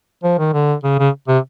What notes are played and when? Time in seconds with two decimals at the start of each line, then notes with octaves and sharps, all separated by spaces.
0.23 F3
0.38 D#3
0.53 D3
0.83 C#3
0.99 C#3
1.28 C3